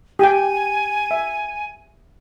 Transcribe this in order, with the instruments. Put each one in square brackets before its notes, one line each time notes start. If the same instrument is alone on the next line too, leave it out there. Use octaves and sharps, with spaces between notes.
[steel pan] G4 G5 [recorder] G#5
[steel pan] E5